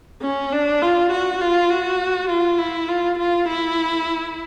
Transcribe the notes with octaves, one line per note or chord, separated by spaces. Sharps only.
C#4
D4
F4
F#4
F4
F#4
F4
E4
F4
F4
E4